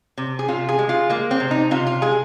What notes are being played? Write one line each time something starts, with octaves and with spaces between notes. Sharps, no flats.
C3
G#4
C3 F4
G#4
G#3
F4
G#3 A#3
C4
C3
D#4
C3 F4
F4
G#3 G#4